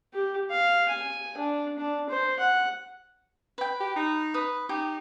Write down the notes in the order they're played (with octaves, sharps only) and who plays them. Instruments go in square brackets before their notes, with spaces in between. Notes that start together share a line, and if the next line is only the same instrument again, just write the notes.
[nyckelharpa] G4
F5
G#5
D4
D4
C5
F#5
[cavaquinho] B4 G5
[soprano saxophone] G4
D#4
[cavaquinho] B4 D#6
[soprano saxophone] D#4 [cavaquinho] G4